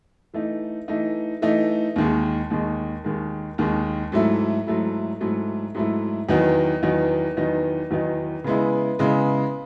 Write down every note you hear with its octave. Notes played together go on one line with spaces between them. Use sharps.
E3 A3 D#4
E3 A3 D#4
E3 A3 D#4
D#2 D#3 G#3
D#2 D#3 G#3
D#2 D#3 G#3
D#2 D#3 G#3
G#2 F#3 A3 E4
G#2 F#3 A3 E4
G#2 F#3 A3 E4
G#2 F#3 A3 E4
E2 D#3 F#3 B3 D#4
E2 D#3 F#3 B3 D#4
E2 D#3 F#3 B3 D#4
E2 D#3 F#3 B3 D#4
C#3 G#3 B3 E4
C#3 G#3 B3 E4